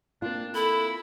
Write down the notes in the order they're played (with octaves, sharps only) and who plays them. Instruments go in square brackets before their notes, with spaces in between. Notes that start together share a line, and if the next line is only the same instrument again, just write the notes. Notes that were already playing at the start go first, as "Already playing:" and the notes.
[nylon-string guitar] A#3 C4 F4 [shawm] D4
[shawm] E4 [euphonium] A4 [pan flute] B5